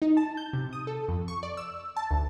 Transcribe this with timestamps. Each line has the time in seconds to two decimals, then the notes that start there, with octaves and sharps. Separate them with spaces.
0.02 D#4
0.17 A5
0.37 G6
0.53 C3
0.73 D#6
0.87 A4
1.08 F2
1.28 C#6
1.43 D5
1.57 E6
1.96 A5
2.11 D2